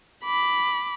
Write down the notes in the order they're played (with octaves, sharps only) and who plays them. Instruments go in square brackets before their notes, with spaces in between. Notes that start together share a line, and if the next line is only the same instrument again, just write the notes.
[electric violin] B5 D6